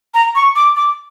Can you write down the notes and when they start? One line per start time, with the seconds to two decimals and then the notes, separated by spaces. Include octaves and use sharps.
0.14 A#5
0.35 C#6
0.56 D6
0.76 D6